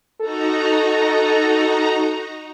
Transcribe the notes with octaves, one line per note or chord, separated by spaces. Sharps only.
D#4 F#4 A4 A#5